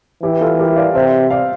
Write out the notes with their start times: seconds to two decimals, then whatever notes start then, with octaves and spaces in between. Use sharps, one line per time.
0.23 E3 E4 G4
0.41 F4 A4
0.59 G4 A#4
0.76 D5 F5
0.95 C3 C5 E5
1.30 D5 F5